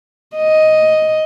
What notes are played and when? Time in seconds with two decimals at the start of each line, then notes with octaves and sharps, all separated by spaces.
0.36 D#5